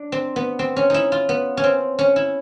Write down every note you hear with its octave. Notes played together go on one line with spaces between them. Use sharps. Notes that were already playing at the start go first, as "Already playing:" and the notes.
Already playing: D4
C4
B3
C4
C#4
D#4 E4
F4
B3
C#4
C4
C#4
E4